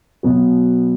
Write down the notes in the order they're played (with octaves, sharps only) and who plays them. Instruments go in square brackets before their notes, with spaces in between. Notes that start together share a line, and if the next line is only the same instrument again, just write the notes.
[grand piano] B2 F#3 B3 F#4